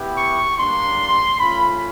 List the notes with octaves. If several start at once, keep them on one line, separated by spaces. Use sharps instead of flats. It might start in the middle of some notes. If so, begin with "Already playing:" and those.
Already playing: B3 E4 G4
C#6
G3 A#3 D4 C6
A3 C#4 F4 B5